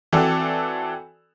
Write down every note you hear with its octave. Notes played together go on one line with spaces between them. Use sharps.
E3 C4 F#4 A4 D5